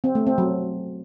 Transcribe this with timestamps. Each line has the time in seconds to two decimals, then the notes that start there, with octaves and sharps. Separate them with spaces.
0.04 C4
0.15 A3
0.27 C4
0.38 F#3